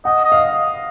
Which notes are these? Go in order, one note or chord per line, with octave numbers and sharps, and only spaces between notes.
D#5 F#5
D#5
F5